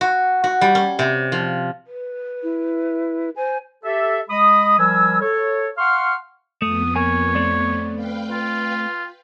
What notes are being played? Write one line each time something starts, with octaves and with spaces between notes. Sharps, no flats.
F#4
F#4
G3
C#4
C3
F3
B4
E4
C5 G#5
G4 A4 E5
G#3 D#5 B5 D#6
F3 G3 A#4 G#5 E6
A4 C#5
F5 F#5 C6 C#6 F6
F2 A3 B3 D#6
A#3 A#4 C#5 G#5
A3 C4 D5
B4 F5 G5
F4